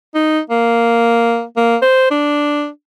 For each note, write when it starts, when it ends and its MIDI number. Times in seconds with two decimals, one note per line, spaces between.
0.15 0.40 63
0.50 1.44 58
1.57 1.76 58
1.82 2.07 72
2.11 2.68 62